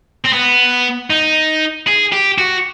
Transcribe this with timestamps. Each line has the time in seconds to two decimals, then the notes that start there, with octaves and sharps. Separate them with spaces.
0.24 C4
0.33 B3
1.10 D#4
1.87 G#4
2.13 G4
2.38 F#4